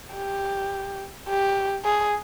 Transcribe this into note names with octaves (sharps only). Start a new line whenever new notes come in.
G4
G4
G#4